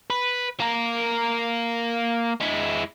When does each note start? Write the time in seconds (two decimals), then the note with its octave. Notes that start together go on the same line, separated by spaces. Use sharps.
0.10 B4
0.60 A#3 A#4
2.40 G#3 E4